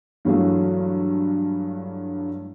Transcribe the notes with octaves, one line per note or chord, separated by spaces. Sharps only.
G2 E3 F#3 A3 G#4 F5